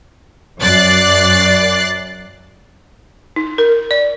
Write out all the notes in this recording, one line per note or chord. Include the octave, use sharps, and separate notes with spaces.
F#2 D5 F#6 A6 C7
D#4
A#4
D5